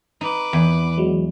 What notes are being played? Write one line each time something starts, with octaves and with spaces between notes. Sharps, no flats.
D#4 B4 D6
E2
F#3 G#3